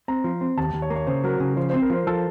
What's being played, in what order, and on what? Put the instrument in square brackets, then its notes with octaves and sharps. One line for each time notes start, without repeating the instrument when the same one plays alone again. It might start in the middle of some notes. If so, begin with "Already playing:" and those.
[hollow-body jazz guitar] C4 [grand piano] A#5
[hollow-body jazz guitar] F3
C4
[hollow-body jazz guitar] D#2 [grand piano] A5
[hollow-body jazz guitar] D#2
[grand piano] C#5
[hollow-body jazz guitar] A#3
[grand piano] C#5
[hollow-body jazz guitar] C#3 [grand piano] C5
[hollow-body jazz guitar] F#3 [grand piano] A#4
[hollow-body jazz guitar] C#3 [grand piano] A#4
[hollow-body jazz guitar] F3 [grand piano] C5
[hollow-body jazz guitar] C4 [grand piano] C5
[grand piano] A#4
[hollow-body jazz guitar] F3 [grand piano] C5
[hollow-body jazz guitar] F3 [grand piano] A4